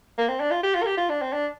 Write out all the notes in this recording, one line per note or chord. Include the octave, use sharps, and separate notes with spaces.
A#3
C4
D4
F4
G4
F4
A#4
G4
F4
D4
C4
D4